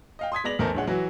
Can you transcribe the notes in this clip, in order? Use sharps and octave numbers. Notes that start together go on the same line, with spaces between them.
D#5 F5 G5
C6 D#6 G#6 B6
G#3 B3 D5 A#6 F7 F#7
A1 E2 A3 A#4 C5 A5
A#1 D3 G#3 C#5 F#5
E3 F#3 F#4